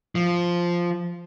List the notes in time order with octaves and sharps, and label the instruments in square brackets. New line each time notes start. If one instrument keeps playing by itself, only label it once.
[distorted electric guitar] F3